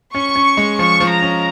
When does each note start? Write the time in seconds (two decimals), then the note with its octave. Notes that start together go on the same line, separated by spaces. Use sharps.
0.15 C#4 C#6
0.36 C#4
0.57 G#3
0.79 F3 C#6
1.00 F3
1.11 A#5
1.22 C#4